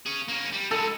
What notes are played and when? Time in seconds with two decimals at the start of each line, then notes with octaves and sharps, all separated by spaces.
0.06 C#4 G#4
0.28 A#3 C#4
0.52 G3
0.71 G#3 A4 B4